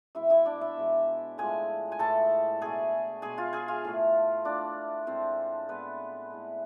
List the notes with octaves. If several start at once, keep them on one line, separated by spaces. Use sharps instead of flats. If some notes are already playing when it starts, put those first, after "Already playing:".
B2 G#3 E4 E5
E4 E5
D4 D5
E4 E5
B2 G#3
A2 F3 G#3 G#4 G#5
G#5
A2 E3 G#3 A4 A5
B2 A3 G#4 G#5
B2 G#3 G#4 G#5
F4 F5
G#4 G#5
F4 F5
A2 F3 A3
A2 F3 A3 D4 D5
A2 G#3 C4 C5
A2 G#3 B3 B4
A2 E3 G#3